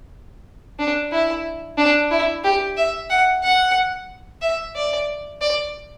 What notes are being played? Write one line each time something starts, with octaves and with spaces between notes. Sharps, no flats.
D4
E4
D4
E4
G4
E5
F#5
F#5
E5
D5
D5